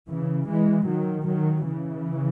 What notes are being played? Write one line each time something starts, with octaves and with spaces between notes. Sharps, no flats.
C#3 E3
E3 G#3
D#3 F#3
D#3 F#3
C#3 E3